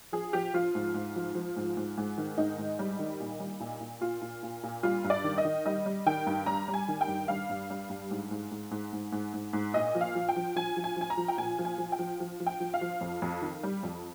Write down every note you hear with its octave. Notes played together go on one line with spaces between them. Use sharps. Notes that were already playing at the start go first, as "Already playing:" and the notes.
F3 G#4
F3 G4
F3 F4
G#2
G#2
F3
F3
G#2
G#2
G#2
D#3
G#2 D#4
G#2
G3
D#3
A#2
G3
A#2
A#2
A#2 F4
A#2
A#2
A#2
G3 F4
G2
D5
D#3
D#5
D#3
G3 D#5
G3
D#3 G5
G2
G3 A#5
G3
G#5
D#3
G5
G2
G3 F5
G2
G3
G2
G#2
G#2
G#2
G#2
G#2
G#2
G#2
G#2
A#2 D#5
F3
F5
F3
G5
F3
F3 G#5
F3
G#5
F3 G#5
A#5
F3
G5
A#2 G#5
F3
G#5
F3
G5
F3
F3
F3
G5
F3
F5
F3
F2
F2
D#3
G3
F2